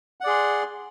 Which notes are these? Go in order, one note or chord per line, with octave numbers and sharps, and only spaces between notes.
G#4 D5 F#5 C6